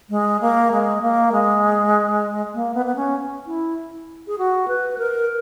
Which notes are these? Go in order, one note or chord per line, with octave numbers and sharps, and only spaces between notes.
G#3
A#3
G#3
A#3
G#3
A#3
B3
B3
C#4
E4
G#4
F#4
B4
A#4